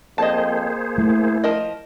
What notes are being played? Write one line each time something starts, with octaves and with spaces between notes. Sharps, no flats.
F2 A#3 G#4 C5 D#5 A5
A3 E4
F3 A#4 D#5